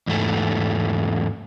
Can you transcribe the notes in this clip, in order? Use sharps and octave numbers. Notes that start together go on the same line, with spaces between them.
E2 G#2 A3